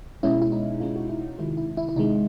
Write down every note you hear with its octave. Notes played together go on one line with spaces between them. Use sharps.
B2 G#3 C#4 E4
E4
D#4
B2 G#3 C#4 F4
F#4
E4
C3 D#3 G#3 E4
E4
E4
E4
C3 D#3 G#3 D#4